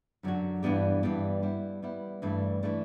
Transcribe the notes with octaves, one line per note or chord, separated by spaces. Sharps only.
F#2 D3 F#3 C#4 F#4
G2 E3 B3 D4 G4
G2 E3 B3 D4 G4
G3 B3 E4
G3 B3 E4
G2 E3 A3 D4
E3 A3 D4